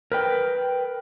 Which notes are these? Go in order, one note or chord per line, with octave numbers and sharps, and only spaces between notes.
A#4 B4 G5